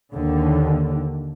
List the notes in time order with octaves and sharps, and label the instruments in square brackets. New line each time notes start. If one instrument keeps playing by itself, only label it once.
[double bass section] D#2 D3